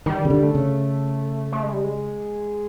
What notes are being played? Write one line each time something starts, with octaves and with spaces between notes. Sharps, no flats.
D#3 G3
C#3
D3
A3
C#3
A3
G#3
G3
G#3